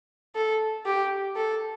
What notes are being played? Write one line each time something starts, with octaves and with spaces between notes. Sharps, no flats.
A4
G4
A4